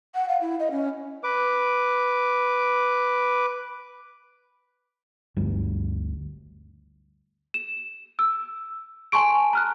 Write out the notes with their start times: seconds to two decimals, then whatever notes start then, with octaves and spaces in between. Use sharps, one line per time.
0.15 F#5
0.29 F5
0.41 E4
0.60 D#5
0.71 C#4
1.24 B4 D6
5.37 G1 D2 G2 G3
7.54 E7
8.19 E6
9.12 G#5 A5 C6 C#6 D7
9.53 A#5 F6 F#6